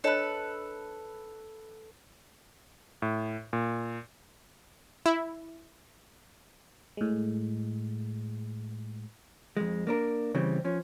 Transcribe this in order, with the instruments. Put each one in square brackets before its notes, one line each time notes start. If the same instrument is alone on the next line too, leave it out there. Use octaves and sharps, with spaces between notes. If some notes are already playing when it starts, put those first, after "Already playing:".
[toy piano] D4 C#5 D#5 [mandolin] A4 B4
[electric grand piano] A2
A#2
[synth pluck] E4
[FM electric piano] A2 G#3
[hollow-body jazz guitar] F2 G#3
A#3 D4 A#4
C#3 E3 G3 C4
F3 C#4